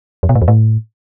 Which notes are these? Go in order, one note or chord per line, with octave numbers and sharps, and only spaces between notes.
F2
B2
A2
E2
A2